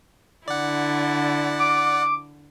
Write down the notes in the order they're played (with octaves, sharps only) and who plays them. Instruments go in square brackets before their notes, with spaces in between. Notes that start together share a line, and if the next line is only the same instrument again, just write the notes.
[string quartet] D3 E4 [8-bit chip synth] D5 F#5
[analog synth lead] D6